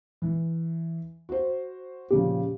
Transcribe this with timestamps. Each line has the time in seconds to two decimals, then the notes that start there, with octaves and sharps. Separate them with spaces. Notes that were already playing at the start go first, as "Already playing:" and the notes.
0.22 E3
1.29 F#4 C5
2.11 A#2 C#3 F3 G4